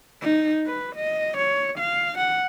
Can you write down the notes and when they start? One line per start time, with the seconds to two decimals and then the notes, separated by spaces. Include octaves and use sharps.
0.22 D#4
0.66 B4
0.96 D#5
1.38 C#5
1.79 F5
2.18 F#5